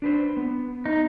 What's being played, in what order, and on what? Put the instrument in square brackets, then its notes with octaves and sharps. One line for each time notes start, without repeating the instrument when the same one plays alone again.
[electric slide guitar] D4 B4 C5
B3
[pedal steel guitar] D#4